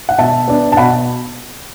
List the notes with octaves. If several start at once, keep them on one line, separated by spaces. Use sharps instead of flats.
F#5
B2 E5 A5
B3 D4
A5
B2 F#5 B5